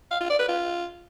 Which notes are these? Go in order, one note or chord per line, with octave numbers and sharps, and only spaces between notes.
F5
F4
D5
B4
F4